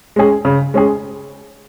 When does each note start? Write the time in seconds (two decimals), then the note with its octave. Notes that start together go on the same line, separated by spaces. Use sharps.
0.16 G#3 C#4 G#4
0.45 C#3
0.74 G#3 C#4 G#4